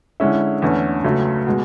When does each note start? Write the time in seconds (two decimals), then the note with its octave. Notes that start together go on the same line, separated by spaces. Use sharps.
0.20 D3 G#3 C#4 E4
0.62 E2 D3 A3 C#4
1.04 C#2 C#3 F#3 A3
1.47 B2 G#3